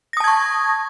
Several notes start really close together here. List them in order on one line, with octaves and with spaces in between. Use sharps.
A#6 D#6 A5 G#6 C#6